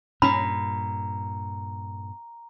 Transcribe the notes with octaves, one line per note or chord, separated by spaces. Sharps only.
G2 A#2 C#4 A#5 B5